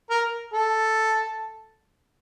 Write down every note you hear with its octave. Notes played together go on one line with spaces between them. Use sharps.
A#4
A4